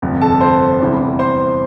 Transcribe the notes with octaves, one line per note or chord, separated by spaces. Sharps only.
G1 F2 C3
A4 A5
C5 C6
E2 C3 E3 G3
C5 C6